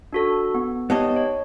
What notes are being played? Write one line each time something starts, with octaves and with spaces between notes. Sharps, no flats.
D4 F#4 A4
B3
B3 D#4 G4 C#5 D#5 A5
C#5